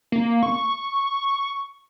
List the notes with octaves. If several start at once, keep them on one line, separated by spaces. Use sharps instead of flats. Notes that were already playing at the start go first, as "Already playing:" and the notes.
A#3
C#6